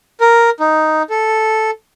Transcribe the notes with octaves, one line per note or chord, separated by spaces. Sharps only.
A#4
D#4
A4